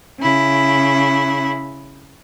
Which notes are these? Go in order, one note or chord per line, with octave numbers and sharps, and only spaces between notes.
C#3 E4